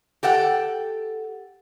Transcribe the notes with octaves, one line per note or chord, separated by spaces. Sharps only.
G4 A4 F#5 G5